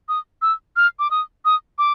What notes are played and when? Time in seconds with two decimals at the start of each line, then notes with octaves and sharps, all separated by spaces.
0.09 D#6
0.42 E6
0.76 F6
0.99 D6
1.11 D#6
1.45 D#6
1.78 D6